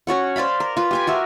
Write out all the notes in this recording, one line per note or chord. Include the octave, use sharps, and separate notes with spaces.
C#4 F#4 C#5 F#5
C5 D5 F5 B5
A#4
F4 B4
G4 G#5 D6
F#4 A#4 E5